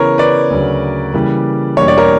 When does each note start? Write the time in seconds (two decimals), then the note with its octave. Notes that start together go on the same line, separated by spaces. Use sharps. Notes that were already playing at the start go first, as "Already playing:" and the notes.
Already playing: C#3 E3 B3 A#4 C#5
0.18 B4 D5
0.50 D2 C#3 F#3
1.14 C#3 E3 G3 A#3
1.77 E2 B2 G3 A#3 D4 C#5
1.88 D5
1.98 A#4 C#5